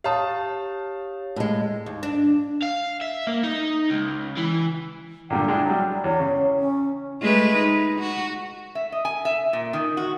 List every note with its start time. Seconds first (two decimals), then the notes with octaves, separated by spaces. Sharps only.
0.04 G4 C#5 F5 A5 D#6
1.36 A2 G#3
1.86 D#2
2.03 D4
2.62 F5
3.01 E5
3.27 A#3
3.44 D#4
3.90 C#2
4.37 E3
5.30 A#2 D3 G3 G5
5.48 G#3 D4 E4
5.66 F#3 G3
6.04 E2 C#5
6.19 C#3
6.59 C#4
7.21 G#3 A3 B4
7.56 D#4
8.00 F#4
8.75 E5
8.92 D#5
9.05 G#5
9.25 E5
9.53 A#2
9.73 D#3
9.97 F#4